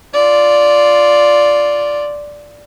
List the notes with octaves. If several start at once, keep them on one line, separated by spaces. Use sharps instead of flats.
F4 D5